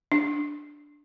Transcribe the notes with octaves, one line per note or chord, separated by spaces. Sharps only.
D4